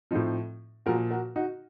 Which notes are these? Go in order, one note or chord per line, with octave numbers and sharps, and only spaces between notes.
A2 F3 C4 D#4
A#2 F3 F#4 A#4
F#4 A#4
D#4 F#4